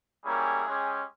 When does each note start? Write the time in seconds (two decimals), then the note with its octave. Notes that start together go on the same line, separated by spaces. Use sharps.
0.24 G3 A#3 C#4 E4 G#4
0.66 G#3 C#4 G4